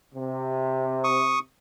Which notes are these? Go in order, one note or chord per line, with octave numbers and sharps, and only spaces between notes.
C3
C#6 D#6